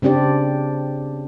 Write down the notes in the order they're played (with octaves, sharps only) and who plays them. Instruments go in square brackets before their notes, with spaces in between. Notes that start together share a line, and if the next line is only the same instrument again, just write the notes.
[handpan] C#3 C4 D4 G4 D5